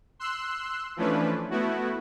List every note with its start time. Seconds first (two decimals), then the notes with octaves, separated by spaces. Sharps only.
0.19 C6 E6 F#6
0.96 E3 F3 A3 C#4 D4 B4
1.50 A3 B3 E4 F#4